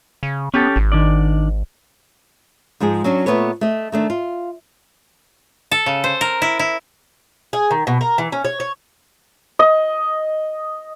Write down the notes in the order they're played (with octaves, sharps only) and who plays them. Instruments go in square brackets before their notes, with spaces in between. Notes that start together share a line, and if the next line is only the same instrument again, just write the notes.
[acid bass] C#3
[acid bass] B3 [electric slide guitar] C#4 G4 A4
[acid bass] G#1
[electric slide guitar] D#3 D4 D5
[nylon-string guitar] G#2 F3 G#3 G#4
F#3 C#4 D4 F#4
A#2 A3 B3 A4 B4 C#5
A3 D#5
D#3 A3 D4
F4
[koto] A4
C#3
C5
A#4
E4
E4
[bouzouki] G#4
D#3
B2
A#4
E3
C#4
C#5
C#5
[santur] D#5